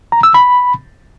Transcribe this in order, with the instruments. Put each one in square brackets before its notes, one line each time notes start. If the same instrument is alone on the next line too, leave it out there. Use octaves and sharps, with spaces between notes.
[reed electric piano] A#5
E6
B5